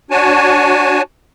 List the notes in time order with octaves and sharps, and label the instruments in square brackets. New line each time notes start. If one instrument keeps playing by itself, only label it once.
[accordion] D4 F#4 C#5 G#5 A5